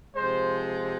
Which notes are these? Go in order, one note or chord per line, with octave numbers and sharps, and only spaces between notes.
C3 F3 G#3 C5